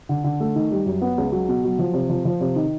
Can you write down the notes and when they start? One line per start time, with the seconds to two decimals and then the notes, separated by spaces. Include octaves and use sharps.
0.09 D3
0.24 D3
0.40 A3
0.56 D#3
0.71 G3
0.86 F#2
1.02 B3
1.18 C#2
1.32 F#3
1.49 B2
1.64 F#3
1.79 F3
1.94 C3
2.09 F3
2.25 F3
2.41 C3
2.56 D#3